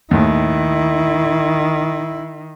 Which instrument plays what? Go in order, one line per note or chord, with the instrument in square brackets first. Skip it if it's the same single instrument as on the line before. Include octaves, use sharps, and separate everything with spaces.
[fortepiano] D#2 A2 [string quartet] D#3 [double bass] E4